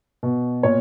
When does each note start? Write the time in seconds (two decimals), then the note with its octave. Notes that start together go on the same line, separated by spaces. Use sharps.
0.23 B2
0.63 A#2 C#5